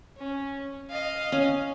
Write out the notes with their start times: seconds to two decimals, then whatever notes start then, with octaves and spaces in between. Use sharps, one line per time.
0.17 C#4
0.89 D#5 F5
1.32 C#4